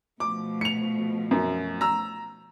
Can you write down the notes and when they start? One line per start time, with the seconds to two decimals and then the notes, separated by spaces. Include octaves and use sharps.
0.20 B2 F3 A3 D6
0.61 C#7 F7
1.31 F#2
1.81 A#5 E6